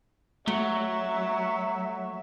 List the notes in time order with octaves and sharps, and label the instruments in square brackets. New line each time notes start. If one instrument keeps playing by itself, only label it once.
[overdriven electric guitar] F#3 [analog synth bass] A3 [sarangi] E5